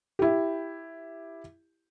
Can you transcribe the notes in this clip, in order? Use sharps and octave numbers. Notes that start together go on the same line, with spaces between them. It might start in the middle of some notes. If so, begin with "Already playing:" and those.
E4 G4